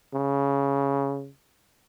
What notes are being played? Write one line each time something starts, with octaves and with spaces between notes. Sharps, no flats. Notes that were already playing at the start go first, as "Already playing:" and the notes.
C#3